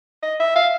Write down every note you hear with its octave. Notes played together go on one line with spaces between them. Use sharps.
D#5
E5
F5